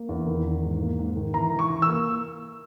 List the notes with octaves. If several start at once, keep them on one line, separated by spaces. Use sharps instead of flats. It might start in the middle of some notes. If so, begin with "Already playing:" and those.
Already playing: A#3
E2
D#3
E2
G#2
A#3
G#2
D#3
E3 A#5
E3
C#6
E3
E6
A#3